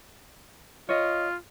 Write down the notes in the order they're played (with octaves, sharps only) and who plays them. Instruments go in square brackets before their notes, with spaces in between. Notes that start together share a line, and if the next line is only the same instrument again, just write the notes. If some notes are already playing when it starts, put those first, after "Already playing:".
[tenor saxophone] F4 [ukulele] C#5 D#5